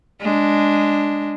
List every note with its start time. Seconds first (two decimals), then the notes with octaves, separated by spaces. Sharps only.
0.22 G#3 D4